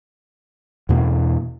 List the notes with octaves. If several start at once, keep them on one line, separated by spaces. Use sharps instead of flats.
E2 B2 A#3